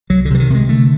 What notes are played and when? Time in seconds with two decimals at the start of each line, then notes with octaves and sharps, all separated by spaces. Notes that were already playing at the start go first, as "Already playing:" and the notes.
0.10 C2 F#3
0.25 D3
0.30 C3 E3
0.40 D#3
0.50 C3 G#3
0.69 D3 A3